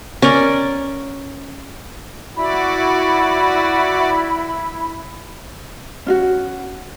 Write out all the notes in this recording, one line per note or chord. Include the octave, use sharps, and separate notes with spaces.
C#4 A#4 D5
E4 F#4 D5 B5
C#4 F4 F#4